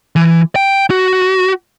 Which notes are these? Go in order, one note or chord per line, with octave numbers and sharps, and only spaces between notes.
E3
G5
F#4